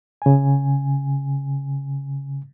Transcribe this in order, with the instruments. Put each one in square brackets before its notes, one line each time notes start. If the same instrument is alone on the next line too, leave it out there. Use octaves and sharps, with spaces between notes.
[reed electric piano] C#3 G#5